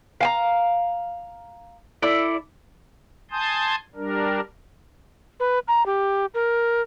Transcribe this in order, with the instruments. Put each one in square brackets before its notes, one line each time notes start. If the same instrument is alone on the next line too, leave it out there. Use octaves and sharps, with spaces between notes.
[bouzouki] F5 G#5 A#5
E4 A4 D5
[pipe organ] G#5 A5 C6 D#6 G6
G3 D4 A#4
[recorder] B4
A#5
G4
A#4